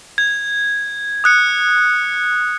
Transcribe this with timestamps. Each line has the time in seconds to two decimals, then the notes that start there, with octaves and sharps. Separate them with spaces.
0.18 G#6
1.24 D#6 F#6 C#7